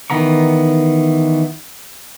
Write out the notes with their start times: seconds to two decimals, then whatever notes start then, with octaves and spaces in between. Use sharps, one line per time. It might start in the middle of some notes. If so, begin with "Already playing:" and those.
0.10 D#3 E3 B3 A#5 C#6